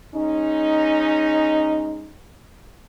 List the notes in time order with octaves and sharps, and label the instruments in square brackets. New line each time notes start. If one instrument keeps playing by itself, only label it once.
[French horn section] G#3 C#4 D#4